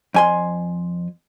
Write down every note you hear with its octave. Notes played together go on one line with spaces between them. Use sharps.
F2 G#5 C6